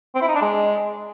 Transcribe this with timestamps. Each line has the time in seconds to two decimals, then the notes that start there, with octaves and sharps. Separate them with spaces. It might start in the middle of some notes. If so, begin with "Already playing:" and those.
0.15 C4
0.22 E4
0.28 D#4
0.35 D4
0.42 G#3